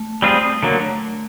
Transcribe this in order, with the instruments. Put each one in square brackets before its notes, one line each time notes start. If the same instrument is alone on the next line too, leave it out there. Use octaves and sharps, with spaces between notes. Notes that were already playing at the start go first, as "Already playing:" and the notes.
Already playing: [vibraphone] A3
[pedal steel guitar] G3 C4 F4 G#4
[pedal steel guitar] D3 F#3 A#3 [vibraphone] A3